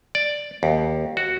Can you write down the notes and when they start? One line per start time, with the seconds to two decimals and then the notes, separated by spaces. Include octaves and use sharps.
0.15 D5
0.63 D#2
1.17 F#4